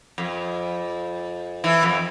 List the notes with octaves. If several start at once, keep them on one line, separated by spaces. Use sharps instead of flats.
F2
E3
F2